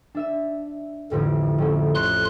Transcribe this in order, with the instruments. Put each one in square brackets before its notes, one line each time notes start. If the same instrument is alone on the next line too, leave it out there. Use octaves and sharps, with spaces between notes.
[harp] D4 E5 E7
[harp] A1 F2 A2 [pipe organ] D3
[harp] F2 A3 C#4
[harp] C#5 [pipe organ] C6 F#6